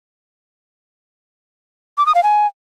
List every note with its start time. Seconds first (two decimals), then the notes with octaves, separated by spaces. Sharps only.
1.98 D6
2.06 D#6
2.15 F5
2.23 G#5